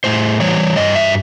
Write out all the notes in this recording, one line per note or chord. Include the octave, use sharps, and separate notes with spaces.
A2 C5
E3 G3 C#5
G2 D#5
E5